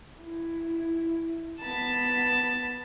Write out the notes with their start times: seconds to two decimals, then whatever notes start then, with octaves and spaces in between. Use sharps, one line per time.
0.19 E4
1.61 B3 A5 B5